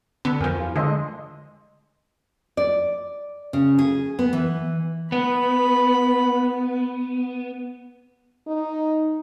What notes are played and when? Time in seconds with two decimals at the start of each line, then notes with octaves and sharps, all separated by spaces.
0.25 D3 B3
0.40 F2 F3 A#4 G#5
0.60 F4
0.76 D3 G#3 D#5 C6
2.57 D5
3.53 C#3
3.79 G#4
4.19 B3
4.33 E3
5.12 B3 B5
8.47 D#4